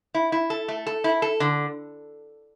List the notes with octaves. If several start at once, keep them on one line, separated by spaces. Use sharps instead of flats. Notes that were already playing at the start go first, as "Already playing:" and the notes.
E4
E4
A4
A3
A4
E4
A4
D3